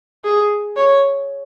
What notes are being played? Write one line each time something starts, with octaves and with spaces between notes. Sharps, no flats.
G#4
C#5